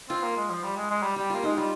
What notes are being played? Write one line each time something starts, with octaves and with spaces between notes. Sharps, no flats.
C4 F4
A#3
G#3
F3
G3
G#3
G#3
G3
G3 G4
A#3 F4
G#3 D#4
G3 F4